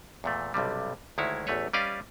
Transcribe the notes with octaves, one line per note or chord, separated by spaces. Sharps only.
E2 A#2 A3
B1 G2 C3 G3
D2 D#3 G#3 E4 C#5
A1 E2 A3 B4 C#5
G3 C#4 B4 D5 D#5 F5